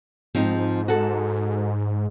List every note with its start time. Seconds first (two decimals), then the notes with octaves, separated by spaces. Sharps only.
0.35 G#2 F3 C4 D#4
0.88 F#4 A4